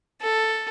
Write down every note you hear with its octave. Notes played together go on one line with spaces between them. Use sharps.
A4